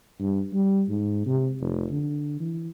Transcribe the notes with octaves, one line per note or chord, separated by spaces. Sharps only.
G2
G3
G#2
C3
F1
D3
E3